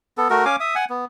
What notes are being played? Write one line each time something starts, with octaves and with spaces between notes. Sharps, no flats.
B3 A4
A3 F#4 A#4
C#4 F5 G#5 D6
E5 D#6
F#5 G#5
B3